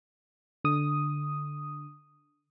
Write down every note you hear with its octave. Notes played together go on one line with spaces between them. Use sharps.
D3 D#6